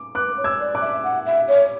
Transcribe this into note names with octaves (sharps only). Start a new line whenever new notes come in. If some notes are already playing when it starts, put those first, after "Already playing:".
Already playing: D6
B4 D6 F#6
C#5
E6 G#6
D5
D6 F#6
E5
F#5
E5
C#5